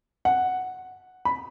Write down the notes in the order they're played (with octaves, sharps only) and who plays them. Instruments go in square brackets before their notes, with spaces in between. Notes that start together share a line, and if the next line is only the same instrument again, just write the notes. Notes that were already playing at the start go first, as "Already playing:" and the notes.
[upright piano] F#5
B5